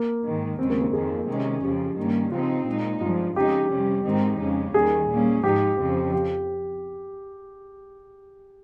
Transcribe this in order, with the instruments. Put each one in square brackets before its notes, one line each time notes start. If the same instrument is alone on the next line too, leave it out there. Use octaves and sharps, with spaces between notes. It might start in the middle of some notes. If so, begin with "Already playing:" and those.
Already playing: [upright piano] A#3
[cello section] G#2 D#3 G#3
[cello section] D#2 C#3 G#3 [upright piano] C4
[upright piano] A#3
A#3
[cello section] F2 D#3 A#3 [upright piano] G#4
[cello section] C3 D#3 G#3 C#4
[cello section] F2 C#3 F3 [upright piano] G4
[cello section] G2 D#3 A#3 C#4
[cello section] C#3 F3 C4 D#4 [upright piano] F4
[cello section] A#2 G#3 D#4
[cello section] G2 F3 G#3 [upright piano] F4
[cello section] F2 C#3 G#3 D#4 [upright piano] G4
[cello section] C3 G3 C#4
G#2 D#3 G#3 C4 D#4
F2 C#3 G#3 C#4
[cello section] D#2 D#3 G3 [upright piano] G#4
[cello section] A#2 G3 A#3 C#4
[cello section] G#2 F3 G#3 D#4 [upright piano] G4
[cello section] F2 C#3 F3 C4
[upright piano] G4